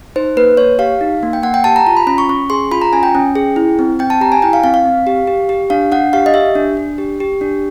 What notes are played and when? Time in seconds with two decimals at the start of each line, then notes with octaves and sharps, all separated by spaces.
0.16 D#4 C5
0.37 A#3 B4
0.57 A#3 C#5
0.79 G4 F5
1.01 D#4
1.23 A#3
1.33 G5
1.43 A#3 F#5
1.54 G5
1.64 G4 A5
1.76 A#5
1.87 F4 A#5
1.97 B5
2.07 C#4 B5
2.18 C#6
2.29 C#4 C#6
2.50 G#4 C6
2.71 F4 B5
2.82 A#5
2.93 C#4 G#5
3.03 G5
3.15 C#4
3.35 G#4
3.56 E4
3.79 C4
3.99 C4 G5
4.10 A5
4.21 G4 A#5
4.32 G#5
4.42 E4 G5
4.53 F5
4.64 C4 F5
4.74 F5
4.85 C4
5.07 G4
5.27 G4
5.49 G4
5.70 D4 F5
5.92 D4 F#5
6.13 G4 F5
6.26 D#5
6.34 G4 E5
6.55 D4
6.77 D4
6.98 G4
7.20 G4
7.41 D4